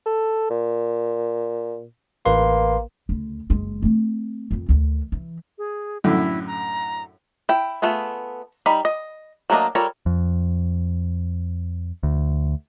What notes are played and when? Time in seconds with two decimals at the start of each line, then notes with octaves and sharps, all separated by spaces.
0.06 A4
0.50 A#2
2.26 A1 A#3 B4 C6
3.09 D2 C#3
3.50 F#1 G#3
3.82 A3 C4
4.51 F2 D#3
4.69 D2 D#3
5.12 E3
5.58 G#4
6.04 F#2 A2 D3 E4
6.47 A#5
7.49 E4 G5
7.82 A3 B3 F4 G#4
8.66 G3 D#4 B5
8.85 D#5
9.50 F#3 A3 A#3 D4 D#5
9.75 G3 F4 A4 A#4 C#5
10.06 F2
12.03 D2